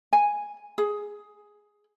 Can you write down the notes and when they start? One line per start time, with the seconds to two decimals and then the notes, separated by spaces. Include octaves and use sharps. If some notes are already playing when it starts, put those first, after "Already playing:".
0.13 G#5
0.78 G#4